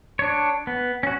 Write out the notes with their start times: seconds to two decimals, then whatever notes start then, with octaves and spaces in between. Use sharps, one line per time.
0.19 D4 C#5
0.67 B3
1.03 C#4 F#4